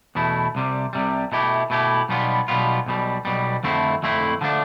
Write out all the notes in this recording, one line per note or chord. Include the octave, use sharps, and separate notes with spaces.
E2 B2 A3 E4
C2 C3 G3
C2 C3 G3
B2 A3 E4 G4
B2 A3 E4 G4
B1 B2 G3 B3 F4
B1 B2 G3 B3 F4
B1 B2 G3
B1 B2 G3
F2 D3 A3 C4 E4
F2 D3 A3 C4 E4
D3 F3 A3 D4